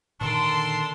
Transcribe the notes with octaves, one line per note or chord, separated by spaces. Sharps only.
A#2 D3 D#3 D4 A4 A#4 C6